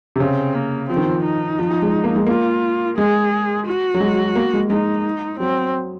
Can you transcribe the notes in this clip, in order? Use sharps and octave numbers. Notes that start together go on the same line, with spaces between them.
C3
C#3 C4
A#3
F3 C4
D#3
F3
D#4
F3
F3
G#3
A#3
G#3
A#3 F4
G#3 G#4
F#4
F#3
G#3
A#3
G#3
G#3 D#4
F#3 C4